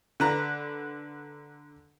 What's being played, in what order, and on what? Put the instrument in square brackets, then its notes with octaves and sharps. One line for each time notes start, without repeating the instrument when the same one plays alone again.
[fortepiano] D3 B4 A#5